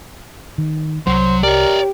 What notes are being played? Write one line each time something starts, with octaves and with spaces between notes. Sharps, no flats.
D#3
C2 F#3 C5
G4 A#4 C#5 D5